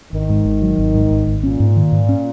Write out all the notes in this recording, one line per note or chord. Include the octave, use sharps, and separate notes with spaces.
G#1 D#3
G#2
G#1
F#3
G#1
G#2
G#1
G#1
A#2 C#4
G#2
D#3
G#2
C#4